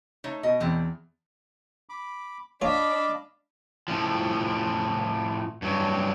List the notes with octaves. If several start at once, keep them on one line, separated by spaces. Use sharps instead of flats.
A3 D#4 C#5
B2 D#5
E2 B2 C4 C5
B5 D6
D4 F4 C#5 D#5 F5 A5 B5 D6
A2 F3
G2 F#3